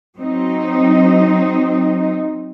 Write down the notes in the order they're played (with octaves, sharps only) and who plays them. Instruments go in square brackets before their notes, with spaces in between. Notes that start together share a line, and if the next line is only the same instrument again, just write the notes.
[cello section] F#3 C4 D#4